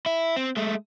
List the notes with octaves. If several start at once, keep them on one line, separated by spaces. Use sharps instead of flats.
E4
C4
G#3 A3